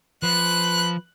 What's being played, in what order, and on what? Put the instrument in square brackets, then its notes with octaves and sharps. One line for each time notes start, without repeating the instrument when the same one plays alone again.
[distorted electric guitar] F3 [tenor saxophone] B4 [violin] F#6